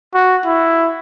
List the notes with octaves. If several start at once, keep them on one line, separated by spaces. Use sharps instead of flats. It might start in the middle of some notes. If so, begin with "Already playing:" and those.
F#4
E4